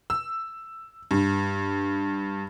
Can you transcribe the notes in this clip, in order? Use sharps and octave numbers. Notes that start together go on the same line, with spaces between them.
E6
G2